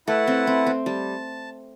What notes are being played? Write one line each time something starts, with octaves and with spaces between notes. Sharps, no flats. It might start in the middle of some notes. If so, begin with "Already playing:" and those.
A3 E4 B4 F#5 A5
C4
C4
C4
G3 A5